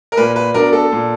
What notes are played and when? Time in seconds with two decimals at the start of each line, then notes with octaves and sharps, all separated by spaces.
0.12 A#4
0.17 A#2 B4
0.36 B4
0.54 F#3 B3 D4 A#4
0.73 A4
0.92 A#2